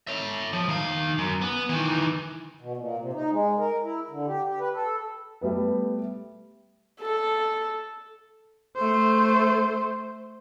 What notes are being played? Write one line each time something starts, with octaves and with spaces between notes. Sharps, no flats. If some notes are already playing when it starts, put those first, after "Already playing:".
C#5 E5
F3
D#3 F5
F#2
B3
D#3 E3
B2
A#2
C3
D#4
G#3
A#4
E4
D3
G4
G4
B4
A4
G3 A3 B3 B4
A4
A3 C5